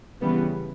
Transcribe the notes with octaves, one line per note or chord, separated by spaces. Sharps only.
C#3 E3 G3 B3